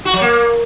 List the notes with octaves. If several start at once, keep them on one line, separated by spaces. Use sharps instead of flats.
F#4
F#3
A#3